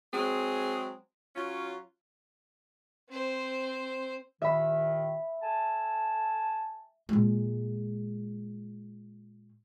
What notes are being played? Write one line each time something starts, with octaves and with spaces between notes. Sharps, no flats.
F#3 G#3 C4 G#4
F#3 C#4 F4
C4 C5
C2 A#2 D#3 E5 B5
A4 G#5 A5
A#2 G#3